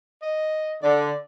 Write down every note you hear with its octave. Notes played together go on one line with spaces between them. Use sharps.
D#5
D3 D5